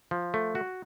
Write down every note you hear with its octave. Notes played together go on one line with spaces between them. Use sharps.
F3
A3
F#4